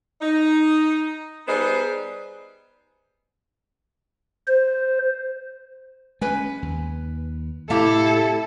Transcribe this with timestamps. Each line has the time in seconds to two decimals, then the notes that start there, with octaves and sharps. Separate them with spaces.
0.21 D#4
1.47 G3 B3 D#4 G#4 B4 C5
4.48 C5
6.21 G#3 C#4 B4 G#5
6.62 D#2
7.70 A2 C3 E4 G4 A4 F5 A5